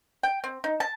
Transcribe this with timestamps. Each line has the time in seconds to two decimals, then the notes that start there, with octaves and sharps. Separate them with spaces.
0.23 G5
0.44 C4
0.64 D#4
0.80 A5